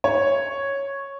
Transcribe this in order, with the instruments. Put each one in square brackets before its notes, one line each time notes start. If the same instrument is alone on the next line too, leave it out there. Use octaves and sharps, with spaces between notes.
[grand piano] C#5